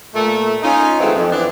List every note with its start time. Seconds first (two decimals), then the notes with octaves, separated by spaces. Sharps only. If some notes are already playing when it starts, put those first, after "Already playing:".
0.15 A#2 A3
0.63 C#4 D#4 F4
1.00 D#3 E3 F#3 G#3 A3 C4
1.14 F2
1.31 D3 E3 B3 C4 D4